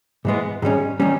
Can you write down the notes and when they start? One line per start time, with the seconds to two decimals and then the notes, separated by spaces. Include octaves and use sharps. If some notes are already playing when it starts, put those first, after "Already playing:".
0.25 G#2 E3 G#3 B3
0.62 G#2 D#3 G3 C#4
1.00 D#3 G3 C#4